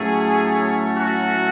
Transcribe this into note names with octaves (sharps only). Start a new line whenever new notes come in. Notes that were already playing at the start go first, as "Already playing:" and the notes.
Already playing: A2 F#3 A3 C#4 G#4
F#4